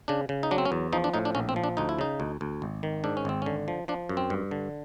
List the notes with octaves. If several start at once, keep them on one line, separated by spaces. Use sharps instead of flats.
C#3 D4
C#3
D#4
F#3 D4
C4
C#4
E2
F3 D#4
D4
A2 D#4
D4
A#1 C#4
C4
F3
D4
D2 D#4
E4
C#3 D#4
D2
D2
G#1
D#3
G#2 D4
C#4
G#1 C4
D3 C#4
F3
F3 D4
F#2
C4
G2
D3